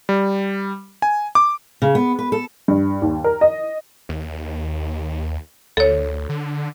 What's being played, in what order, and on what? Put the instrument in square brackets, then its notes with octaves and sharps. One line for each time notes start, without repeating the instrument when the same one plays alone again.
[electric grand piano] G3
G#5
D6
[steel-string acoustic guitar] C#3
B3
B4
A4
[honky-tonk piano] G2
D#2
A#4
D#5
[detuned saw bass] D#2
[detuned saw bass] D2 [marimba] A4 C#5
[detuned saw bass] D3